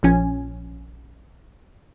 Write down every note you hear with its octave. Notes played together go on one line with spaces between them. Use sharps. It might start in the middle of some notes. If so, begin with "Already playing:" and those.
A#1 F3 C#4 G#5